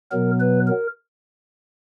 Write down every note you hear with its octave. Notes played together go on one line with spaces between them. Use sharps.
B2 F#3 B3 A#4
B4
A#4